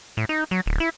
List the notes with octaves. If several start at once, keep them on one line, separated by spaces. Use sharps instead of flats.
A2
D#4
F#3
D1
E4